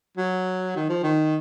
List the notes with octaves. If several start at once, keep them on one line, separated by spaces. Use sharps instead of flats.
F#3
D#3
F3
D#3